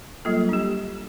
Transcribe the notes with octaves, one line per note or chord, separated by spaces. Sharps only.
F#3 G3 A#3 F4 A4
D4 G4